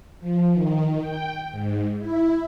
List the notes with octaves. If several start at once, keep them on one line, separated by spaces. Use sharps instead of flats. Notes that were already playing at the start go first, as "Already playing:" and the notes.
F3
D#3
G5
G#2
E4